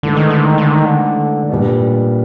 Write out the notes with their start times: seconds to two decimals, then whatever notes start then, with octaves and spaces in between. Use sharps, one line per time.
0.03 G#2 D3 E3 A3
0.17 D#3
0.30 D3
0.44 D#3
0.58 D3
0.72 D#3
0.85 D3
1.49 A#2 G3 B3 D4